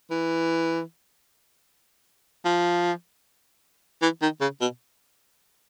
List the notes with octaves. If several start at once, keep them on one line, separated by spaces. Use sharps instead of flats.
E3
F3
E3
D#3
C#3
B2